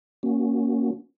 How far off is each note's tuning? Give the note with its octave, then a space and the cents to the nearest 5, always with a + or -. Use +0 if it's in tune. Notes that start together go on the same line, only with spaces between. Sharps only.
A#3 +0 C#4 +0 F#4 +0